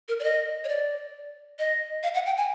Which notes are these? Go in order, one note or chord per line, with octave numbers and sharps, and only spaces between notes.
A#4
D5
D#5
C#5
D5
D#5
F5
F#5
G5
G#5